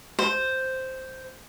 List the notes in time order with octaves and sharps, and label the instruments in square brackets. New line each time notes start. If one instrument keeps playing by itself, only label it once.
[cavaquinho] C5